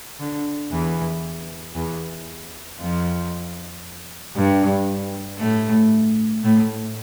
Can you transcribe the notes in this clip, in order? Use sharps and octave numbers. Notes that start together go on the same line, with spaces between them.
D3
E2 E3
E2 E3
F2 F3
G2 G3
A2 A3
A2 A3